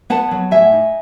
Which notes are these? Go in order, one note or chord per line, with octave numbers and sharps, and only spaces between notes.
B3 F#5 A5
F#3
A2 E5 G#5
D#4